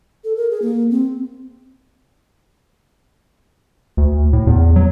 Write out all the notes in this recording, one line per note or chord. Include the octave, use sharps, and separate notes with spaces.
A4
A#4
G#4
A#3
C4
D2
A2
E2
F#3